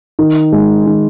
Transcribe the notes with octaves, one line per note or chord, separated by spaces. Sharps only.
D#3
G#3
D#3